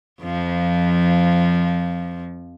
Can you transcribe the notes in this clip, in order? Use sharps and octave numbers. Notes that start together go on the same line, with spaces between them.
F2 F3